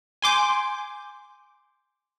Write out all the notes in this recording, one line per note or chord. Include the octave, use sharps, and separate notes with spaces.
G#5 C6 D6 G6